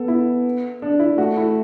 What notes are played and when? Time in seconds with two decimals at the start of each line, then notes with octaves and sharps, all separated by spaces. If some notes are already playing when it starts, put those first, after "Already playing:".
Already playing: B3 A4
0.08 E4
0.82 D4
1.00 E4
1.18 A3 F#4
1.37 E4